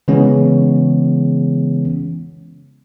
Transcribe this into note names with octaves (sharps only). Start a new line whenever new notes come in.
C#3 E3 G#3 B3 C#4